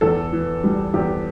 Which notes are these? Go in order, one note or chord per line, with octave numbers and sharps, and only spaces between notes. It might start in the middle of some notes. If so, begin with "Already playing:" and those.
E2 A4
E3
G3
E2 G4